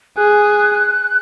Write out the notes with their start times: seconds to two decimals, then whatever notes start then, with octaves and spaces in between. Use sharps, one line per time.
0.17 G#4 F#6